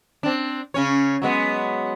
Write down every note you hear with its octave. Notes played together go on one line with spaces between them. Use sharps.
C4 D4
C#3 C#4 C#5
F#3 G#3 B3